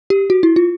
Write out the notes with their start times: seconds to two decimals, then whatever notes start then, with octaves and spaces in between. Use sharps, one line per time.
0.10 G4
0.30 F#4
0.43 E4
0.56 F4